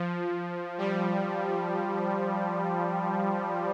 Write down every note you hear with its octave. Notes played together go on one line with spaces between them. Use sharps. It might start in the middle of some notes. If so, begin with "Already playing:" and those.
Already playing: F3
G3